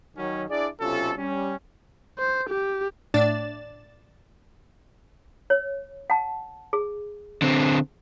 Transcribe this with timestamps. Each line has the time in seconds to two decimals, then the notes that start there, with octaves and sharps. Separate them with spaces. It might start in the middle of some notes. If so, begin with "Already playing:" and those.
0.16 D#3 F#3 C#4
0.49 D4 E4 G#4 D5
0.80 B1 C3 C#4 F4 A4
1.17 G3 C#4
2.18 C5
2.49 G4
3.14 A2 D4 D5 A6 E7
5.50 C#5
6.10 F#5 A5
6.73 G#4
7.42 D3 C4